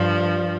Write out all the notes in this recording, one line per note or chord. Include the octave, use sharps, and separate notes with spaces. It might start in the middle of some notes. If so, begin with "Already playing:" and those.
Already playing: G2 F3